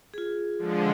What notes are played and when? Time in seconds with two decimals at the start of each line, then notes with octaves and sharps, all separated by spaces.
0.14 F4 G#4
0.58 D3 F3 G#3